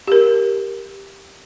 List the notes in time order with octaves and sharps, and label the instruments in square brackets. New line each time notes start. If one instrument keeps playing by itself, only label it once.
[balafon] G4 A#4